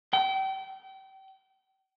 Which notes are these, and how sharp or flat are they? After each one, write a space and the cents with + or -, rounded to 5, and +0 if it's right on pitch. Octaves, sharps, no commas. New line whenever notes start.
G5 -30